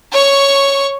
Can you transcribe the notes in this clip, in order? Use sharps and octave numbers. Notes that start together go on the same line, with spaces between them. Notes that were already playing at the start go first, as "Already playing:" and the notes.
C#5 C#6